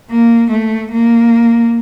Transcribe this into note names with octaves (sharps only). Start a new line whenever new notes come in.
A#3
A3
A#3